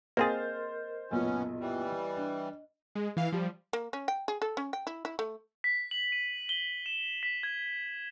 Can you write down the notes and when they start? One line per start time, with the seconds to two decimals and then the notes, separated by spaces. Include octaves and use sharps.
0.17 A#3 C4 G#4 A#4 C5 D#5 F6 A6
1.11 F#1 B1 A#2 B3 C#4 D#5
1.60 E3 G3
2.17 D4
2.95 G#3
3.17 E3 F5
3.32 F3 G3
3.73 A#3
3.93 C#4
4.08 G5
4.28 G#4
4.42 A4
4.57 C#4
4.73 G5
4.87 E4
5.05 E4
5.19 A3
5.64 B6
5.91 F#7
6.12 D#7
6.49 G7
6.86 E7
7.23 B6
7.43 G#6